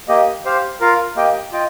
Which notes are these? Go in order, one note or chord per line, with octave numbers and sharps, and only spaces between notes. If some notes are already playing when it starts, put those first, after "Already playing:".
A#3 G4 D#5
G4 C5 F5
F4 A#4 F5
A#3 G4 D#5 G5
F4 D#5 G5